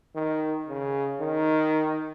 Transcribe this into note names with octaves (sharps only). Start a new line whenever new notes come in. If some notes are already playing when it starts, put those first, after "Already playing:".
D#3
C#3
D#3